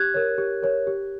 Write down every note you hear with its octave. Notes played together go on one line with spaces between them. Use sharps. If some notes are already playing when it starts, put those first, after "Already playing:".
Already playing: G4 F#6 G#6
A#4 C#5
G4
A#4 C#5
G4